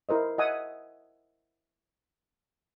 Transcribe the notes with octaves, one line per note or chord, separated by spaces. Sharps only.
E4 A#4 C5 D#5
D#5 E5 F#5 G#5 D#6